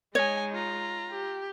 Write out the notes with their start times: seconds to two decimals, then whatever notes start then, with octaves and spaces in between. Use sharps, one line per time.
0.15 G#3 D#4 C#5 D#5 G#5
0.54 F4 A#5
1.11 G4